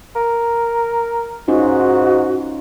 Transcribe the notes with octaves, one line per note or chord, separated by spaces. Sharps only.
A#4
G#2 C#4 D#4 F4 F#4